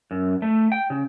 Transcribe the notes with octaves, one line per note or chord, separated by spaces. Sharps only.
F#2
A3
G5
C#3